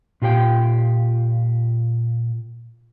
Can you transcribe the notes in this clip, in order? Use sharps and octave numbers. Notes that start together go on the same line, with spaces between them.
A#2 F4 G4 A#4 G5